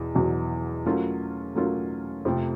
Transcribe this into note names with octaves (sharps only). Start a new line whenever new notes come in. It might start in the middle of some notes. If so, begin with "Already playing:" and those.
Already playing: E2 B2
E2 B2 F#3
F#3 A3 C#4 F4 A#4
F#3 A3 C#4 F4 A#4
F2 C3 F3 A3